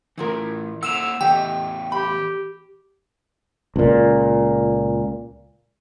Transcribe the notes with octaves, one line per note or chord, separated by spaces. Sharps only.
A2 E3 E4 F4 A#4
A#3 A4 F#5 E6 E7 F7
E3 A3 B3 G4 D#5 G5
G4 B5
C#2 A#2